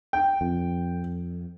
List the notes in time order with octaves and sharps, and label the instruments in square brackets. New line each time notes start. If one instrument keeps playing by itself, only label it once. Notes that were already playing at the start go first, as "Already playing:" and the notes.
[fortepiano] G5
[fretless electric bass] F2